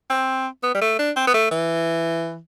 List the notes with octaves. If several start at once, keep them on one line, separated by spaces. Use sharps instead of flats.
C4
B3
G3
A3
D4
C4
B3
A3
E3